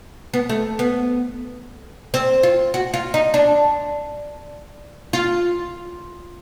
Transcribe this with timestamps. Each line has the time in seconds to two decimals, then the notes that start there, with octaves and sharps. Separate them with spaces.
0.34 B3
0.49 A3
0.79 B3
2.14 C4
2.43 F4
2.74 F#4
2.94 F4
3.14 D#4
3.34 D4
5.13 F4